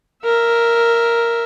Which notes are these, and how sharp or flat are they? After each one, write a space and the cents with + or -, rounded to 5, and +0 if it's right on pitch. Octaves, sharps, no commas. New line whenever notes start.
A#4 +0 E5 +0